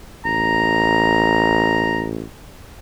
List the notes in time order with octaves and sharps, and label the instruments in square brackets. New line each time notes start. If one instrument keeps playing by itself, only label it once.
[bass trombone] A1 [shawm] A#5